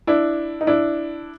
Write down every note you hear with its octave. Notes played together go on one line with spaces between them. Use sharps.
D4 E4
D#4
D4 E4